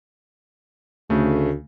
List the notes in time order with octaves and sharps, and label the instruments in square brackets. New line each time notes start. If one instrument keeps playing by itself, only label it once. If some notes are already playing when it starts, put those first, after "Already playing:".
[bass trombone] D2 [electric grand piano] C#3 A3